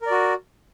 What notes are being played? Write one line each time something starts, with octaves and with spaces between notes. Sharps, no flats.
F#4 A#4 D5